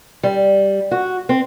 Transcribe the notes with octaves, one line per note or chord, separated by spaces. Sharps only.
G3
F#4
C4